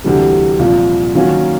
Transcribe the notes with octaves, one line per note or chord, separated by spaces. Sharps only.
D2 C3 E3 G3
C2 A#2 F3
D#3 F#3 A#3 C#4 F#4